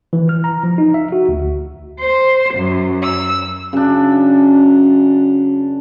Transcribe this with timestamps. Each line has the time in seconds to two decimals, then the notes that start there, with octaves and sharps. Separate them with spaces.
0.13 E3
0.29 F6
0.44 A#5
0.63 F3
0.78 D#4
0.94 E5
1.12 F#4
1.29 D2
2.01 C5
2.54 F#2
3.05 E6
3.73 F#2 C#3 D4